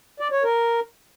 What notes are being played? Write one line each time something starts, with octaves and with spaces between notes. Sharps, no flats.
D5
C#5
A#4